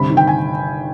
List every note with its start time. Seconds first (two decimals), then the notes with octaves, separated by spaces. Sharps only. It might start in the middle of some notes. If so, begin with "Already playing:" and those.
Already playing: G1 C3 B5
0.10 D#3
0.17 G5
0.27 G#5